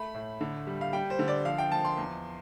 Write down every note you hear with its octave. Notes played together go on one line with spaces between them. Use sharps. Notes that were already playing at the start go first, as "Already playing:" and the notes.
Already playing: A3 B5
A2
D3
G3
F5
G3 G5
C5
D3
D5
F3 F5
G5
F3 A5
C6
E2